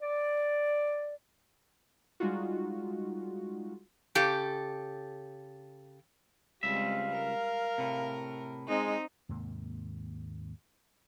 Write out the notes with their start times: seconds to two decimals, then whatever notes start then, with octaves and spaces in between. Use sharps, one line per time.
0.02 D5
2.20 G3 G#3 D#4 F4 F#4
4.15 C#3 G4 A4
6.63 C#2 G3 G#3 C4 E5 F5
7.14 A#4
7.78 A2 C3
8.68 G#3 C4 D#4
9.29 D#2 G#2 C3 A#3